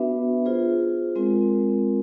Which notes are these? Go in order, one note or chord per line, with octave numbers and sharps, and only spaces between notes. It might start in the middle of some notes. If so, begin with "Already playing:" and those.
Already playing: B3 D4 F#4 B4 E5
F4 G#4 C5
G#3 C4 F4 A#4